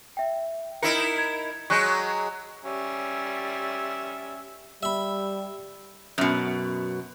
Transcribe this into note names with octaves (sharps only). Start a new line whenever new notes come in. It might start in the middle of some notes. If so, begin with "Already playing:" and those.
E5 G5
D#4 E4 A#4 C#7
G#6
F#3 G#3 C#6 F#6 G6
G3 C#4 E5
G3 E5 B5
F#2 B2